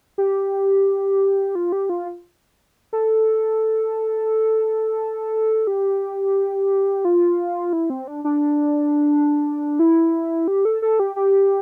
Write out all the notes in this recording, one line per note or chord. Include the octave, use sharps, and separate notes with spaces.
G4
F4
G4
F4
A4
G4
F4
E4
C4
D4
D4
E4
G4
A4
A4
G4
G4